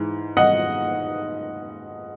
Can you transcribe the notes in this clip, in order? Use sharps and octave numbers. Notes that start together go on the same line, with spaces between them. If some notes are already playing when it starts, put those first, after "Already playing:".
Already playing: G#2 E3
D#5 F#5